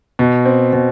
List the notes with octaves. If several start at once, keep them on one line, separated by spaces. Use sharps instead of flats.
B2
C4
B2